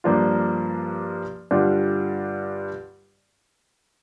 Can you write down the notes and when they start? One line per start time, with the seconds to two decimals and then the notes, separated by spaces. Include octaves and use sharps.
0.04 G2 F3 A#3 D4 F4
1.51 G2 D3 G3 D4 F4